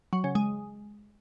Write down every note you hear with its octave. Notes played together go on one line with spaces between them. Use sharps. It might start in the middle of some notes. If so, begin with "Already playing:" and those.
F#3
C#3
G#3